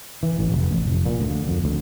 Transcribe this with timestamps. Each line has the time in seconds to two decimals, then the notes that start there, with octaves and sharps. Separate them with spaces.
0.23 E3
0.39 A1
0.52 F1
0.71 A1
0.85 F1
1.06 A#2
1.20 D2
1.48 F2
1.64 D2